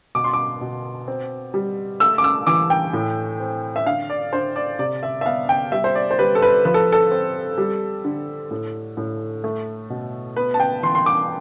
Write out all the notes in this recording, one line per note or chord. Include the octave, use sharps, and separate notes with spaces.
B2 D6
C6
D6
B2
C4
G3
A3 E6
D6
E6
E3 D6
G5
A2
C4
E5
D3 F5
D5
D3 C5
D5
C3 D5
E5
E5
B3 F5
G5
G3 E5
C5
D5
C5
G3 B4
A4
B4
F3 B4
A4
A4
C4
G3
D3
A2
A2
A3
B2
B3 B4
A5
G5
E3 C6
C6
D6